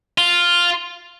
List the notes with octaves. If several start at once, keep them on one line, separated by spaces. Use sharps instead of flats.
F4